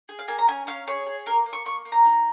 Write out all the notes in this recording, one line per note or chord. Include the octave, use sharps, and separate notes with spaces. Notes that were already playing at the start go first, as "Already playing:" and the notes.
G#4
F5
A#3 G#5
A#5
C#4 G#5
C#4 F5
G#4 C#5
G#4
A#3 A#4
A#3
C#6
A#3 C#6
A#3
A#5
D#4